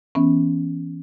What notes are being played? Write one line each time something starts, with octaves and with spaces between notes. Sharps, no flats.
E3 B3 C#4